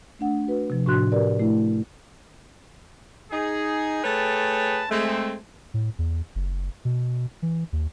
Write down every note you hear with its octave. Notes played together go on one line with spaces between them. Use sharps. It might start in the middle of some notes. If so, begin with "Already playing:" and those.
A3 D4 F#5
F#4 B4
C3 F3
A2 D4 F#4 C6 F#6
G4 A#4 B4 D5
A3 E4
D#4 G#4
A3 G#4 B4 C#5 G5 A5
G#3 A3 C4
A2
E2
F#1
B2
E3
D#2